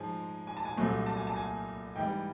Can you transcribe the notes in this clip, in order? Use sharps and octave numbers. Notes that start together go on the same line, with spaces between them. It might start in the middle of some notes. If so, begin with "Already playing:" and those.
Already playing: G#2 F3 G#3 G#5
G#5
A5
G#5
C2 A#2 F#3 A3
A5
G#5
A5
G#5
G#2 E3 G3 G5